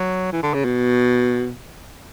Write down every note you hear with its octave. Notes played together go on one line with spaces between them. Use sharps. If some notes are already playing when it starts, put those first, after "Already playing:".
Already playing: F#3
E3
D3
C#3
B2